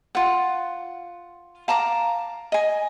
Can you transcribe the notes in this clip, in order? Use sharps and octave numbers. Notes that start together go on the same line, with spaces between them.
F4 F#5
F5 A5 A#5 D6
D#5 G#5